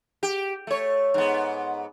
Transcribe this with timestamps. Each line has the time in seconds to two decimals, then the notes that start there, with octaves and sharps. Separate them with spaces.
0.23 G4
0.67 A3 C#5
1.14 G#2 B3